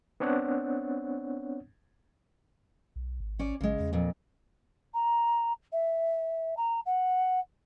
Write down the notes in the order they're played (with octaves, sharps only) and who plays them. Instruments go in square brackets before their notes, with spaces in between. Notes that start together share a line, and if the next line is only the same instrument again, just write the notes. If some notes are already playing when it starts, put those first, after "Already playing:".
[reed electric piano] B3 C4 D4 C#5 F#5
[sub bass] B1
G#1
[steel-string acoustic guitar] C#4 C#5 D5
[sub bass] A1 [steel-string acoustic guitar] C#3 G#3
[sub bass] E2
[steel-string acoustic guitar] F2 A#2
[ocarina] A#5
E5
A#5
F#5